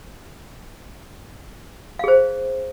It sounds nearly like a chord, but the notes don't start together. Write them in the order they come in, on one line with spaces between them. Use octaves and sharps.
F5 G#4 C5